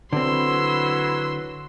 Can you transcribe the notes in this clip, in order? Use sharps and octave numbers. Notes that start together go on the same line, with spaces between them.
D3 F#3 C4 E4 B4 C6 E6